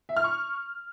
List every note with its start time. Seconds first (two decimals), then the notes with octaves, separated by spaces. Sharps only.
0.09 E5
0.17 F6
0.24 C#6